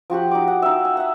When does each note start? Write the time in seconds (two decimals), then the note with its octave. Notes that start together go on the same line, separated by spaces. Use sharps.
0.10 F3 F#4 G4 F#5
0.31 D#4 D6
0.48 F#5
0.62 D#4 E5
0.85 G#5
0.97 E5 F#5